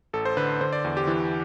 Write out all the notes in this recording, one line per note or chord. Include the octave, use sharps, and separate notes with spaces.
A1 A4
C5
D3 B4
D3 C5
D5
E2
G4
E3